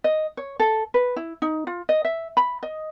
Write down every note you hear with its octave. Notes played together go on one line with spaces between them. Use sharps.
D#5
C#5
A4
B4
E4
D#4
F4
D#5
E5
B5
D#5